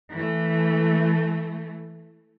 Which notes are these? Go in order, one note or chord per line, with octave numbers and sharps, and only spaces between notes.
E3 A3